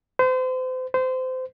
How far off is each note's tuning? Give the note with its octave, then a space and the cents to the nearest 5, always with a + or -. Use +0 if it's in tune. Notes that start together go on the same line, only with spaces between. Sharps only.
C5 -35
C5 -25